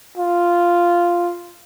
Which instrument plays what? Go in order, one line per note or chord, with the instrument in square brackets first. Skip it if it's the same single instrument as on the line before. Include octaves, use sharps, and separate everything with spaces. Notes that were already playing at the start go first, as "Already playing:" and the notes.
[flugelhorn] F4